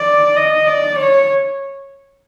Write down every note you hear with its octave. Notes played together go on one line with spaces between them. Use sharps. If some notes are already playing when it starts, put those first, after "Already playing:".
Already playing: D5
D#5
D5
C#5